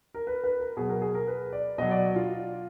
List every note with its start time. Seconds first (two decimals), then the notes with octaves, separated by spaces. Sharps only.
0.15 A#4
0.27 B4
0.44 B4
0.60 A#4
0.77 B2 F#3 G#4
0.89 A#4
1.02 G#4
1.15 A#4
1.27 B4
1.53 D5
1.78 B2 F#3 D#5
1.91 D5
2.16 F4